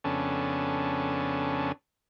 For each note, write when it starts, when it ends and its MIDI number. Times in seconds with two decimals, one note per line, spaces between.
0.04 1.72 41
0.04 1.72 49
0.04 1.72 59
0.04 1.72 61
0.04 1.72 62
0.04 1.72 69